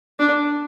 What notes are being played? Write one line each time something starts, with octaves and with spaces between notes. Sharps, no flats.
D4